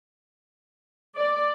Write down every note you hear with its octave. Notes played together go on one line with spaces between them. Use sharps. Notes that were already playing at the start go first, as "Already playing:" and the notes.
D5